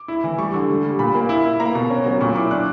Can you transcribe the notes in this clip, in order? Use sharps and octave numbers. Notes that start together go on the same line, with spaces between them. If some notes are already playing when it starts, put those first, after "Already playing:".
Already playing: D6
E4
E3
G3 C#6
D3
G3
G3
A#2 B5
A#3
E4
E4
A#3 A#5
B2
C#4
F#3
A#2 C#6
E4 D6
D4 F#6